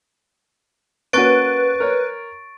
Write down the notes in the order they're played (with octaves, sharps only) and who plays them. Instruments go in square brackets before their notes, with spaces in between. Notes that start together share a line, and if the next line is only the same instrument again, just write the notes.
[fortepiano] A#3 C#4 F#4 [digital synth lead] B4 [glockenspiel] C#6 A6 D7
[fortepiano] A#4 C#5